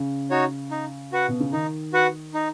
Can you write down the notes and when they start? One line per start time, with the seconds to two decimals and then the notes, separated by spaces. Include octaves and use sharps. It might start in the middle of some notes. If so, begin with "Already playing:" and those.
Already playing: C#3
0.30 D#4 F#4 C#5
0.71 D#4
1.12 F#4 B4 F#5
1.28 B2
1.40 C#3
1.52 D#3 D#4
1.93 F#4 B4 F#5
2.34 D#4